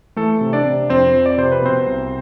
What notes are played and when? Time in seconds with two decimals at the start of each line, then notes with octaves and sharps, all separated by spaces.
0.16 E3 A3 A4
0.41 C3
0.53 D4 D5
0.65 C3
0.90 F2 C4 C5
1.14 F3
1.26 D5
1.38 C3 C5
1.52 B4
1.62 B2 C4 C5
1.86 C2